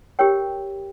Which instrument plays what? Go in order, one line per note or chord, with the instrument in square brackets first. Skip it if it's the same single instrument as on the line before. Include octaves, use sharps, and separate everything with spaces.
[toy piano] G4 A#4 C#5 G5